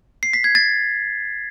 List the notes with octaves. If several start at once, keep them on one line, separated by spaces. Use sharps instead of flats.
C7
B6
G#6
A6